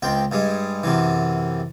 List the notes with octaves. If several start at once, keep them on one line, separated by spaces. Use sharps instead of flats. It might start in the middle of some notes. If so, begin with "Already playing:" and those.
C#2 C4 G5
G2 G3 G#3
F#2 C3 E3